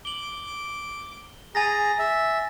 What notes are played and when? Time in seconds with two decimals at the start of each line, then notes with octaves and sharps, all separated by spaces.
0.05 D6 F#7 G7
1.55 G#4 G#5 A#5 A6 A#6
1.99 E5